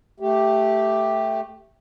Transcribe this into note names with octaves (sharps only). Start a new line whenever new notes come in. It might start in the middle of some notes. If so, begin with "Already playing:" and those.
A3 G4